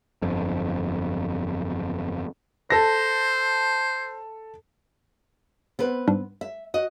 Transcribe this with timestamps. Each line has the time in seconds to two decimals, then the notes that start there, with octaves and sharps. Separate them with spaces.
0.22 G1 F2
2.70 A4 C5 A#6
5.79 B3 C4 B4
6.08 G#2 G3 D4
6.41 E5
6.74 F#4 D#5